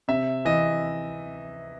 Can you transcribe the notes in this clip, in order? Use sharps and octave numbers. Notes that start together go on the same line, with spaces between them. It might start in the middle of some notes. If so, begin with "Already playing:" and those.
C3 E5
E3 D#5